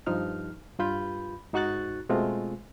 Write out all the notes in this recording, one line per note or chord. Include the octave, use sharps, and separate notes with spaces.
G2 F3 D#4 F6
G2 F4 B5 G6
G#2 D#4 F#4 C#6 F#6 A6
B2 G#3 A3 C4 F4